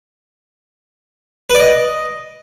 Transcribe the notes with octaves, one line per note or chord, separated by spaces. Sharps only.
B4
D5
D#5